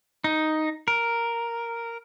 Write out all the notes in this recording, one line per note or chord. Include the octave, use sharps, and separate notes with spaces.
D#4
A#4